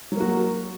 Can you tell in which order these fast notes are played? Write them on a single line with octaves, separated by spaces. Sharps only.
F#3 A#3 F#4